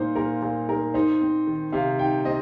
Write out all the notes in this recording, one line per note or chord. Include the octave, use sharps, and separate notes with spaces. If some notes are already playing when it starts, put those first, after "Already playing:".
Already playing: A#2 A#3 D#4 C5
A#2 A#4
A#2
D#4 A#4
D#4 C5
C4
D#3
C3 F5
D#4 G5
C4 D#5